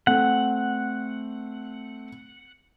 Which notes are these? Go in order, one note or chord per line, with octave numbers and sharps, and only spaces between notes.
A3 C4 F#5